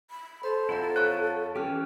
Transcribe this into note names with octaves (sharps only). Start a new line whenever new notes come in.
B5
A4 C5 B5
F2 E4 G#4 C5 F#5 A#5
E4 C#5 F5 F#5 C#6 F#6
A5
E3 C#4 G4 G5 F6